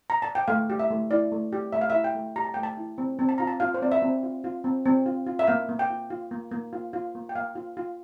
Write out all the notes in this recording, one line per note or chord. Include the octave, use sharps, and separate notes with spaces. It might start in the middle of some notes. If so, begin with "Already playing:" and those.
A#5
A5
G5
A3 F5
G4
E5
A3
E4 D5
A3
G4
A3 E5
F5
E5
E4
G5
A3
G4 A#5
A5
A3 G5
A5
E4
C4
C4
A5
F4 A#5
A5
F4 F5
C5
C4 D5
E5
C4
F4
F4
C4
C4
F4
F4
E5
A#3 F5
A#3
G5
F4
F4
A#3
A#3
F4
F4
A#3
G5
A#3 F5
F4
F4